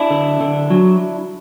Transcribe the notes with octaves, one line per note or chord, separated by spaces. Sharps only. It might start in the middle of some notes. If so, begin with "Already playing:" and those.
Already playing: D4 E4
D3
D3
F#3